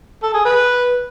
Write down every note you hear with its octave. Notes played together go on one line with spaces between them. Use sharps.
A4
G#4
B4